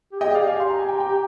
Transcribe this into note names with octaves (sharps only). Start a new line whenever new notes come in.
G4
G#4 D#5 G5
D5 F5
G4
F5 G#5
C6
A#5
G#5
G5 A#5
G5 A#5